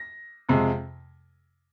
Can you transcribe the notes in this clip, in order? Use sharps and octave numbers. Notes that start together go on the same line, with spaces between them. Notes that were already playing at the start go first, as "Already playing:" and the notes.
Already playing: A#6
F2 C3 G#3